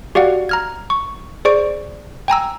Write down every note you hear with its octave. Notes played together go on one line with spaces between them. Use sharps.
F#4 G4 D5 F5 F#5
A#5 F6 G#6
C#6
G#4 C5 D5 C#6 D7
G5 G#5 A#5 E6